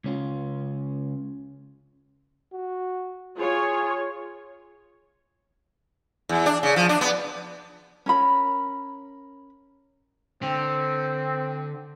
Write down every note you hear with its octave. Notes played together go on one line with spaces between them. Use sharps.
C#2 C#4 F4
F#4
F4 G#4 C#5
E2
D4
C#3
F3
D4
B3
C#4 A#4 B5
D3 C4